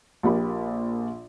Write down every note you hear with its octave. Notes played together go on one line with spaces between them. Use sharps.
A#1 A#2 G4 B5